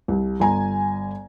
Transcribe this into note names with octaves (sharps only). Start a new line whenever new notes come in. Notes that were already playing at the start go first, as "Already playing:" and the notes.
C2
G1 G#5 A#5